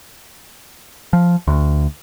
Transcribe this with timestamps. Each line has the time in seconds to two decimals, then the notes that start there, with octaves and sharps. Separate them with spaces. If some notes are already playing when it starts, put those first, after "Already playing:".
1.13 F3
1.47 D2